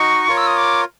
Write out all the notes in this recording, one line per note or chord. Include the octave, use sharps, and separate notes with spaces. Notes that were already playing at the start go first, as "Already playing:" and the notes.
Already playing: D#4 F#4 D#5 C#6
F4 A#4 C#5
E6
D#6
D6